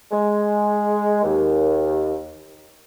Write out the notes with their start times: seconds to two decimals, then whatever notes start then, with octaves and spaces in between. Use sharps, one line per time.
0.12 G#3
1.23 D#2